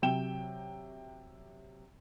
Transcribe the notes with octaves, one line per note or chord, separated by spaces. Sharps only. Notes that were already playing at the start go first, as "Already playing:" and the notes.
C3 F#3 G5 E7 G7